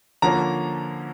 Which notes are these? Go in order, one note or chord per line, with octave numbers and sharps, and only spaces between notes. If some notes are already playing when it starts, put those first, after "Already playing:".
D3 F3 A#3 C#4 A#5